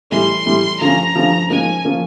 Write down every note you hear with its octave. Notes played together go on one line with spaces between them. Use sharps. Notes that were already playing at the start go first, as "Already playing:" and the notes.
A2 E3 G3 C6
A2 E3 G3
G2 D3 F3 A3 C#4 A#5
G2 D3 F3 A3 C#4
G#2 F3 A#3 C#4 G#5
F3 A#3 C#4